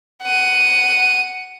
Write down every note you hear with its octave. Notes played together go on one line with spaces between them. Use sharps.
F#5 D#7